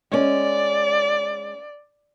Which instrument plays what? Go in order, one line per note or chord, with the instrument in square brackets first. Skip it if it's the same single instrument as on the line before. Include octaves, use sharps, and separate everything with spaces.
[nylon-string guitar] G#3 C#4 [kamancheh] D5